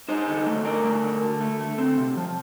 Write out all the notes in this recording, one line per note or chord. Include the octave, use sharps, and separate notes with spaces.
D#4 C5 D#5
D3
A3
A3 A#4 D5
A3
D3
D3
A3
A3
C4
C3
F3